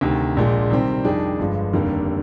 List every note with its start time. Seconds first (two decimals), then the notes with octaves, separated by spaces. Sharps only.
0.01 D2 C3 D#3
0.37 A#1 A#2 G#3
0.70 C3 D#3 G3 C4
1.05 F2 D#3 G3 D4 G#4
1.39 G1 G2 D3 F3 G#3
1.73 F1 D#2 D3 G3 A#3